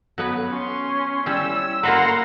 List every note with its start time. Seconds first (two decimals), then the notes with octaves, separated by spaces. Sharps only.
0.18 F#3 B3 B4
0.51 C#4 C6
1.26 G3 C#4 E4 E6
1.83 A#3 F#4 B4 F#5 A#5 C6